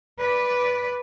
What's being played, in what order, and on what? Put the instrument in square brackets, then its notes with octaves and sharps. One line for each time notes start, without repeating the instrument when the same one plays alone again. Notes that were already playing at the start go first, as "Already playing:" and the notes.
[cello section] B4 D5